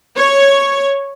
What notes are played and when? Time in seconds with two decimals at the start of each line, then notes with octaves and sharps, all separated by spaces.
0.17 C#5